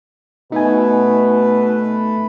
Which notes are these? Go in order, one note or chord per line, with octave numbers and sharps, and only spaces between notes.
B2 A3 D#4 B4 G#5